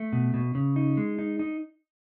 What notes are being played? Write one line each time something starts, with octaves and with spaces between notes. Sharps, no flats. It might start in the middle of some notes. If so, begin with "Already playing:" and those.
Already playing: A3
B2
B2
C#3
D#4
G#3
D#4
D#4